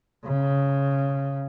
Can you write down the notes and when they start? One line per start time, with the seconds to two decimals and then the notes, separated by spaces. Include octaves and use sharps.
0.25 C#3